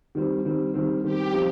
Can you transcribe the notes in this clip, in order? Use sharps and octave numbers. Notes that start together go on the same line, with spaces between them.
D#3 G3 C4
D#3 G3 C4
D#3 G3 C4
D#3 G3 C4 G4
F3 C4 D#4 G4